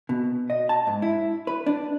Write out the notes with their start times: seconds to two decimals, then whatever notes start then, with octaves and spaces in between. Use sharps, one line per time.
0.09 B2
0.50 D#5
0.69 A5
0.87 G#2
1.02 E4
1.47 B4
1.66 D4